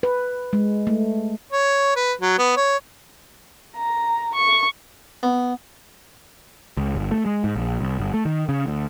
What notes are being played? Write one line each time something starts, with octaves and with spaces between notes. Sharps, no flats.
B4
G#3
A3
C#5
B4
F#3
B3
C#5
A#5
C#6
B3
C#2
G1
A3
G#3
G#2
A#1
C2
G1
A3
D#3
C#3
D2